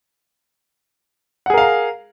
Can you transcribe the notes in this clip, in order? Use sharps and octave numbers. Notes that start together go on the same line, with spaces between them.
G#4 A#4 F5 F#5 A#5